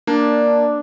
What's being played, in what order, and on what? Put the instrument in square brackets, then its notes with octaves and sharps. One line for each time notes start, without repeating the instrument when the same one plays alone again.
[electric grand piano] A#3 [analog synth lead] D4